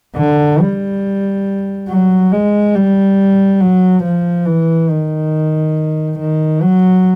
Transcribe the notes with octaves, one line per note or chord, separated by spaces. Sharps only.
D3
G3
F#3
G#3
G3
F#3
F3
E3
D#3
D#3
F#3